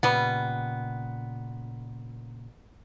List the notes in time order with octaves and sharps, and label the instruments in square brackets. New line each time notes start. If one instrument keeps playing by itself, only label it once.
[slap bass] A#2 C#3 [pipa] G3 B3